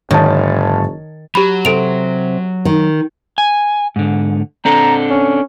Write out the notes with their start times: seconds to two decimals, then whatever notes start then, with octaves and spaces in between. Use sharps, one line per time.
0.11 F#1 G#2 D3 D#3 F#3 C#5 A5
1.35 F#3 G4 B5
1.65 C3 A4 D7 F7
2.65 D#3
3.38 G#5
3.96 G#2 D3
4.65 C4 D4 A4 A#5
5.10 C#4